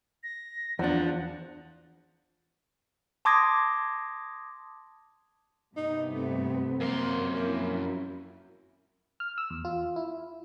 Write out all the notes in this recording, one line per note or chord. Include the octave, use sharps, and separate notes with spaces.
A#6
E2 F3 D4 F#5
A5 C6 D6 D#6 G#6 A#6
G2 C3 B3 D#4
A3 C4
F#2 A#3 C6
F2 A#3 E4
F6
E6
E2
F4
E4